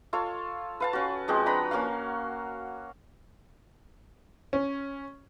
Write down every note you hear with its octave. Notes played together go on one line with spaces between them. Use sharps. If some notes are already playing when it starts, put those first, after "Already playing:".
F4 A4 C#5 F5
B4 F5 A5
C#4 F#4
F3 G#3 C4 F#4
D4 B4 A#5 B5
A#3 C#4 F#4 F5
C#4